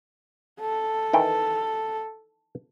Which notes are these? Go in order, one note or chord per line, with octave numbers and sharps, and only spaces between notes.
A4
D#3 E3 G5